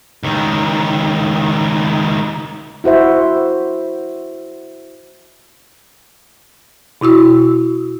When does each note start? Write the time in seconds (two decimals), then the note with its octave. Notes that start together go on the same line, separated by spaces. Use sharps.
0.23 C#2 D#3
2.84 E4 F#4 C5 E5
7.01 B2 E4 F#4 E6